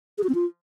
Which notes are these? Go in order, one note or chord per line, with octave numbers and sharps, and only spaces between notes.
G#4
F#4
C4
F4